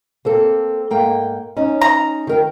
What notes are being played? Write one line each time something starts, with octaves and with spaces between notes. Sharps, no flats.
A#3 C4 A4
G#2 A#3 G5
C#4 D#4
A#5
D#3 A#4 G5